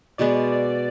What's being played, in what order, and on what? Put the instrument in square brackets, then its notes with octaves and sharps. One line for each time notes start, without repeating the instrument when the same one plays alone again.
[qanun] B2 G#3 B3 [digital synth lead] D5